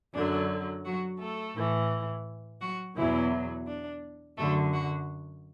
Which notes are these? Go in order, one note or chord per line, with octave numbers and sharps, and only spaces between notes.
F#2 D3 F#3 D4
F#3 F#4
A3 A4
A2 E3
F#3 F#4
E2 B2 E3 F#3 E4
D4
F#2 D3 F#3 A3 A4
F#3 F#4